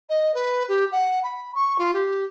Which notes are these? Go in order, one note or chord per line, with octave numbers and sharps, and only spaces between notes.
D#5
B4
G4
F#5
B5
C#6
F4
G4